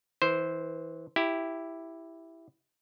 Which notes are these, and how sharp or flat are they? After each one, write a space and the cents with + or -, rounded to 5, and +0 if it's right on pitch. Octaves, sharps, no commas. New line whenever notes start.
E3 -20 C5 +0
E4 +0 G4 +0